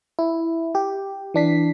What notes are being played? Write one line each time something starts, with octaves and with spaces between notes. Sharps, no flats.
E4
G4
E3 D4 B6 C7